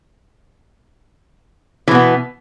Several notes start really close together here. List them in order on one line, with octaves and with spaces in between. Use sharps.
E3 B2 B3